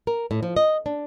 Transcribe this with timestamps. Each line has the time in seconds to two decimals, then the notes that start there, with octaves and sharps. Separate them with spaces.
0.07 A#4
0.31 A2
0.43 F3
0.57 D#5
0.86 D4